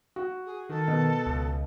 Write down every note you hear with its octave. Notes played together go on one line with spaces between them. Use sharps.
F#4
G#4
D#3 A4
B2
C#2